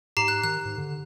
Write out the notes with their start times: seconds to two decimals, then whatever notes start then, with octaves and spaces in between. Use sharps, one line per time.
0.17 G#2 G4 A#5 C7
0.28 F#6
0.44 D#3 F#6
0.65 G#2
0.78 D3